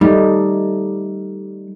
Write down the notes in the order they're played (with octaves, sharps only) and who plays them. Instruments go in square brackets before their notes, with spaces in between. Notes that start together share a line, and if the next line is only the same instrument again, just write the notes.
[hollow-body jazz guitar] G3 [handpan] A3 D#4